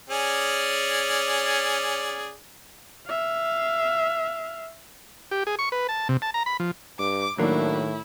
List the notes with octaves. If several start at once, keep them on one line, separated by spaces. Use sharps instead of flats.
C#4 G#4 D5
E5 F5
G4
G#4
C#6
B4
A5
C3
A5
A#5
B5
F3
G2 D6
A2 D#3 F#3 A#3 D4 E4